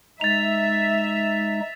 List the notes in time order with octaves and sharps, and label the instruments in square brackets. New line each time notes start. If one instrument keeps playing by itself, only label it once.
[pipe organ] G#3 D#4 [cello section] E5 [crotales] A6 F7